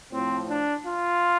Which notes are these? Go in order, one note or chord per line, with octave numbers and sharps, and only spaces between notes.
A2 F3 C4
D4
F4